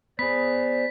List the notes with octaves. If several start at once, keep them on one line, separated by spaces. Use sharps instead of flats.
B3 G#4 C5 D5 B5 B6